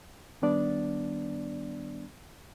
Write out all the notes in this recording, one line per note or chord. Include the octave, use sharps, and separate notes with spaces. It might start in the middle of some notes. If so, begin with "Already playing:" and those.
D#3 G3 B3 D4 D5